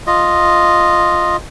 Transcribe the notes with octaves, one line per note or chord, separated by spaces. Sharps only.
F4 D#5